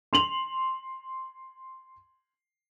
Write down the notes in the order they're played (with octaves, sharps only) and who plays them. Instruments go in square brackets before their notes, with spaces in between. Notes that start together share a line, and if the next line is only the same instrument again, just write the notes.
[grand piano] C6 F7 F#7